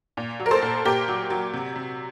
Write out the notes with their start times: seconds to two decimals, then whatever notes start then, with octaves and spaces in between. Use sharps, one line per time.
0.17 A#2
0.40 F#3
0.46 A#4
0.51 A4 C5
0.62 A#2
0.85 A#2 G4 A#4
1.08 F#3
1.30 F#3
1.53 C3
1.76 C3